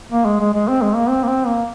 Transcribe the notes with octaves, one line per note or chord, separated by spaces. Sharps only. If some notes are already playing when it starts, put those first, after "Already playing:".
A#3
G#3
G#3
G#3
C4
G#3
A#3
C4
A#3
C4
A#3